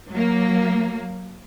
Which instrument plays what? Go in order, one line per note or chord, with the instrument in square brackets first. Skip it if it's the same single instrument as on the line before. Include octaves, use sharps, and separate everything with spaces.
[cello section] F#3 A#3